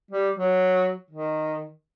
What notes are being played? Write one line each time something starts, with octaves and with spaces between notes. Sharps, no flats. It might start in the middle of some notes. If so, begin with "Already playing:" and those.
G3
F#3
D#3